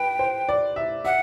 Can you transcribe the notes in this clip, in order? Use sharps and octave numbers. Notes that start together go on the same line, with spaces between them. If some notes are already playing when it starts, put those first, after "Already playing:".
Already playing: B4 G5
C5
D5
E5
E5 F#5